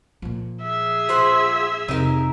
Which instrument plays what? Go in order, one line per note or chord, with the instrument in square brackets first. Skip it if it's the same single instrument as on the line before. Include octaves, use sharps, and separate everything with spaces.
[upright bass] A#2 F3
[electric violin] G#4 E5
[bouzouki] F4 C5 F#5
[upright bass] F2 C3 [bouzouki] D#4 A#4